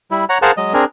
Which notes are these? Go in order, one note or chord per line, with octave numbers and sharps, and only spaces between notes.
G3 E4
C#5 F#5 A#5
G#4 A#4 C5 F5 F#5 A5
F#3 G#3 D#5
C4 D4 G#4 A#4